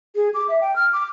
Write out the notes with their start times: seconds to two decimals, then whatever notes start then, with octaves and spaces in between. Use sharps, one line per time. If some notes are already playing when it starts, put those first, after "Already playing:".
0.15 G#4
0.34 D6
0.49 E5
0.61 G5
0.76 F6
0.93 D6